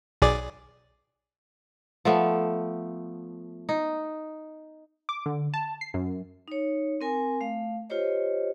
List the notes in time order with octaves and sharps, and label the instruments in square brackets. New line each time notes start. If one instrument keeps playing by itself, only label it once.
[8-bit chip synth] B1 G#4 D5
[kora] F3 A3 B3
D#4
[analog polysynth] D6
D3
A5
C7
F#2
[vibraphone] D#4 C#5
C4 A#4 G#5
A3 F5
F4 G4 C5 C#5 D#5